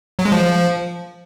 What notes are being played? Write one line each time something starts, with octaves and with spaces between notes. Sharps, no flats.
F#3
G#3
F3